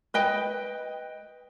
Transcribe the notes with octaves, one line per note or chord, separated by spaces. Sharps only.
B4 D#5 G5